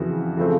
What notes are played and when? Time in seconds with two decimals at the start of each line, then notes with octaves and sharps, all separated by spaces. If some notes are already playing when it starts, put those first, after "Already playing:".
Already playing: F2 C#3 E3 F#4
0.37 C#3 F3 A3 C4